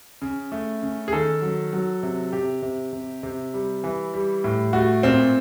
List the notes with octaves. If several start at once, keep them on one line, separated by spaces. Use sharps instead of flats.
C#3
A3
C#3
G#4
D#3 A4
F#3
F#3
C3
C3 G4
C3
C3
C3
G3
E3
G3
A2
A3 F#4
A#2 C4